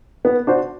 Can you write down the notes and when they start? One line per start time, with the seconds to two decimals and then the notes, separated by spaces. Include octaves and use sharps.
0.25 B3
0.47 D4 F#4 C5